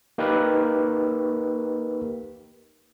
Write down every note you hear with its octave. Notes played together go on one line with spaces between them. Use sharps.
A#3 D#4 G4 A#4 B4